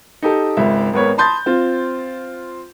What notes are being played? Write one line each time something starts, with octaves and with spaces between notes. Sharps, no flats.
D#4 G4 A4
G#1 C#2 E5
G#1 B3 A#4 B4 C#5
A5 B5 C6 D#6 G6 A6
C4 F4